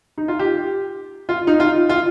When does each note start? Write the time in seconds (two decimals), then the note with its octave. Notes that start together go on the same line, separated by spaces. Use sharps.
0.18 D#4
0.28 F4
0.39 G4
1.29 F4
1.47 D#4
1.60 F4
1.89 F4